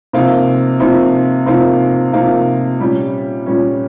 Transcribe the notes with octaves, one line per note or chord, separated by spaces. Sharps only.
C3 F3 A#3 D#4
C3 F3 A#3 D#4
C3 F3 A#3 D#4
C3 F3 A#3 D#4
A#2 G3 C#4
A#2 G3 C#4